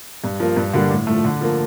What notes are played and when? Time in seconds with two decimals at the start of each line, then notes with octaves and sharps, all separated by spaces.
0.24 G2
0.40 F3 A#3
0.56 G2
0.74 D3 G3 A#3 D4
0.91 A2
1.07 F3 A3
1.24 D3
1.41 F3 A#3